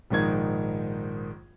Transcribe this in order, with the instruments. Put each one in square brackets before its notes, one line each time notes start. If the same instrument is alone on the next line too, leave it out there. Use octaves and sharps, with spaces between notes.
[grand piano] A#1 G#2 D#3 G#6